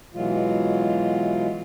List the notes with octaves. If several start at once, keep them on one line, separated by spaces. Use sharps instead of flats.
B2 E3 F#3 G#3 F4